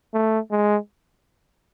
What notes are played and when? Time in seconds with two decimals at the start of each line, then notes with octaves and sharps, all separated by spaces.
0.13 A3
0.51 G#3